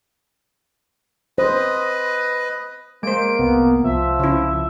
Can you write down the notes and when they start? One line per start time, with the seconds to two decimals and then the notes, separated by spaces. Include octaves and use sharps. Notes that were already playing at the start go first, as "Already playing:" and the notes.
1.38 B4 C5 D#5
3.03 G#3 A#3 C5 D7
3.39 F1 C2 C3 B3
3.84 C2 F3 E5
4.19 C#3 E4